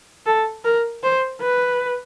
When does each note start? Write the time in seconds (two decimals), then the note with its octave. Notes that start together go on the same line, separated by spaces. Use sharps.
0.26 A4
0.64 A#4
1.03 C5
1.41 B4